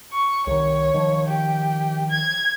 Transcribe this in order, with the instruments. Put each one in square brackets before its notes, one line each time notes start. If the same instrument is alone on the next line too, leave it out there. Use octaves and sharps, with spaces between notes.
[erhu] C#6
[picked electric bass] C2 D#3 [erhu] C#5
[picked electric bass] D#3 F3
[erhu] G4
G#6